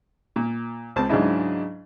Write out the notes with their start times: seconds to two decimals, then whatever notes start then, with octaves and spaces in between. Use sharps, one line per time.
0.36 A#2
0.96 C#2 C4 A5
1.09 G#2 C#3 F#3 D4 E4 D#5